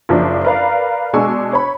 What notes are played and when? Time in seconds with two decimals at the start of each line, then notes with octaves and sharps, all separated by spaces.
0.09 F#1 F3 D4
0.45 A#4 B4 D5 F5
1.13 B2 G#3 D4 G#5 C#6 E6
1.53 C#5 B5